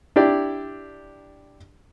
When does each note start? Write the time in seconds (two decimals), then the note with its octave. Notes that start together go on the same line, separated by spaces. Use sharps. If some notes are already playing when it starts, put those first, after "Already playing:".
0.16 D4 E4 G4 D5